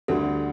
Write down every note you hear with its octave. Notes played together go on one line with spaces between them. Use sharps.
D2 D3 G3 A4